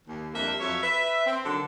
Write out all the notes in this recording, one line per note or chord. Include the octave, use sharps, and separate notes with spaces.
D#2
F2 G3 A#3 D4 E5
F2 F#3 C#5 E5
B4 E5
C4
D3 D#3 F#3 D4 A4